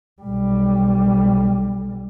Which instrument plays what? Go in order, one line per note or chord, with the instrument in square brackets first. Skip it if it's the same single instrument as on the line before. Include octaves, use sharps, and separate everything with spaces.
[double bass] B1 G3